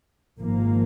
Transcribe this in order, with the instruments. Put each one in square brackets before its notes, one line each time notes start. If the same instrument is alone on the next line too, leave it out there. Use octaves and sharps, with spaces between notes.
[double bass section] G#1 G#2 F3 A#3